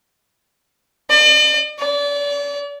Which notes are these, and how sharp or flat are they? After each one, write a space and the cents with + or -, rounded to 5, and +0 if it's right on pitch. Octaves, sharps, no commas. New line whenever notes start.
D5 +45
D5 -35